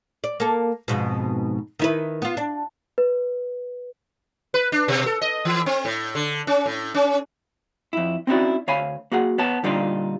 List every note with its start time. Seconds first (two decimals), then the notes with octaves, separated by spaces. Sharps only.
0.24 D5
0.40 A#3 A4
0.88 F2 G#2 B2
1.79 D#3 E4 B4
2.22 B3 F4
2.37 D4
2.98 B4
4.54 B4
4.72 D4
4.88 B2
5.06 A4
5.21 D#5
5.45 E3
5.66 C4
5.85 A2
6.15 D3
6.47 C#4
6.66 A2
6.94 C#4
7.93 F2 E4
8.27 C4 C#4 D#4 E4 F#4 D5
8.68 D2 C#5 F5 G#5 B5
9.12 A#3 F#4 G#4 F#5
9.38 B3 C#5 A5
9.63 A#2 D3 G3 D4 D#4 F4